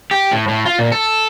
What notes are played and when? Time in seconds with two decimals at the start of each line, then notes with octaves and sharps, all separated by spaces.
0.11 G4
0.31 A2
0.48 A2
0.66 F4
0.79 A#2
0.92 A4